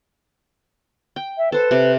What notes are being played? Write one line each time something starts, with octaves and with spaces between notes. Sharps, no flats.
G5
E5
A4 B4 C5
C3